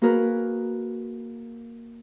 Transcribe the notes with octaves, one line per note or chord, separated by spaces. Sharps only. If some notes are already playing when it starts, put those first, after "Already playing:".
A#3 F#4 G#4 A#4 B4